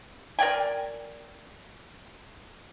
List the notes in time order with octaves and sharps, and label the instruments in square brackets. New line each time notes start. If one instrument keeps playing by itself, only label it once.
[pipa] A#4 D5 G5 G#5